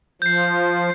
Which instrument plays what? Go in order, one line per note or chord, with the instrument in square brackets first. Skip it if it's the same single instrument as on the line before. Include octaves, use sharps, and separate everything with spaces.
[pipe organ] F3 [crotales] G6 C7